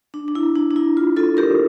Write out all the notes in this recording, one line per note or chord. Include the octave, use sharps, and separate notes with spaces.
D4
D4
E4
D4
D4
E4
F4
F4 A4
G4 A#4